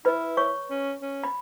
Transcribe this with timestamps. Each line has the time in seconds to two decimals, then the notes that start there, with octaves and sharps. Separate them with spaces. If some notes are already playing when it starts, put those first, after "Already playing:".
0.05 E4 B4 B5
0.37 C#5 C#6
0.70 C#4
1.02 C#4
1.24 B5